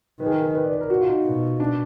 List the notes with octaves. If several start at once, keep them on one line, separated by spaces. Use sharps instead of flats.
D#3 B4
G#4
A#4
A#4
B4
D5
B4
A#4
F#4
F4
D#4
B2
D4